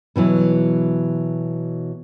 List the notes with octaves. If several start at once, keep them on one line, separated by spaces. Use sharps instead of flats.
B2 E3 F#3 E4